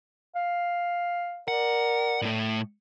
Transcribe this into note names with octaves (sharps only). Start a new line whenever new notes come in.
F5
A#4 D5 F#5
A2 A3